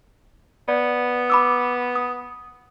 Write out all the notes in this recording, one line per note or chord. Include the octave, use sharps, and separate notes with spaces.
B3 D5
B5 D6 E6
D#6